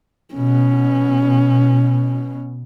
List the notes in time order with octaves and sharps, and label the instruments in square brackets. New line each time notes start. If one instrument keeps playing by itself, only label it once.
[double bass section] B2 [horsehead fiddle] C#4